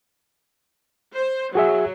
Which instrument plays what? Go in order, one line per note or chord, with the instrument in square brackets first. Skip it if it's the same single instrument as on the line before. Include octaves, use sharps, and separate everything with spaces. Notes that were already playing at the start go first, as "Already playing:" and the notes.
[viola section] C5
[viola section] F#3 [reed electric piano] F#4 G#4 E5